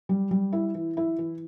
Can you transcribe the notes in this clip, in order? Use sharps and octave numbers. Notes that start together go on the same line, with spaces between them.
G3
G3
E4
E3
E4
E3